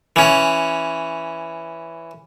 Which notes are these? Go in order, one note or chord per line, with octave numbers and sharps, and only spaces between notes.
E3 C#4